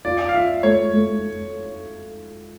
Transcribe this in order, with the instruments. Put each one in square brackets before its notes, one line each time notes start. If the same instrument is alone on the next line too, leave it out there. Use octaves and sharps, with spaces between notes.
[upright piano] F4 [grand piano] D5
[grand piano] F5
[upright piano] F4 [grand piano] E5
[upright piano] A3 [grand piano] C#5
[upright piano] A3